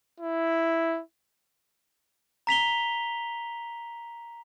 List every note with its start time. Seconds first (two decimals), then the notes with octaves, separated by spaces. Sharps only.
0.20 E4
2.47 A#5 B6 F7 G7